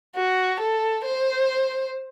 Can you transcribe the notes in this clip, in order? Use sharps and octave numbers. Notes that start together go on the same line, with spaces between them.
F#4
A4
C5